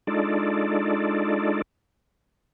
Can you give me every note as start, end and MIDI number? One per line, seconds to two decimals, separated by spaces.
0.07 1.62 56
0.07 1.62 62
0.07 1.62 63
0.07 1.62 65
0.07 1.62 69
0.07 1.62 74